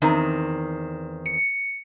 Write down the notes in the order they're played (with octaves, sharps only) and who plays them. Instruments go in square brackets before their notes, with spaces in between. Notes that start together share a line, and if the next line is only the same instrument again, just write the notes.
[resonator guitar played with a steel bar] E2 D#3 C4
[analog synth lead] C#7